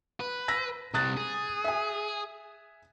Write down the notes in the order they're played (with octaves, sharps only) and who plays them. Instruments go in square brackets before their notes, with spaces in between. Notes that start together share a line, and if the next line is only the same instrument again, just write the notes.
[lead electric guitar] B4
[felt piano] E6 A#6 B6
[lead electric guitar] C2 C3 [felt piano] D#6 F#6 A6
[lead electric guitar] G#4
[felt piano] E5 G#5